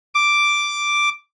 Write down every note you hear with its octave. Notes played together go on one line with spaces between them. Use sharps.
D6